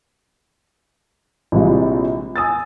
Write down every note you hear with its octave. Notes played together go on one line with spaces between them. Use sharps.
A#1 C3 G3 G#3 E4 F4
G#5 D#6 E6 A6